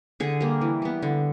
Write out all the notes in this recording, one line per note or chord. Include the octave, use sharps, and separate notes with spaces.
D3 G#4
G3 A#3
E3
G3 B3
D3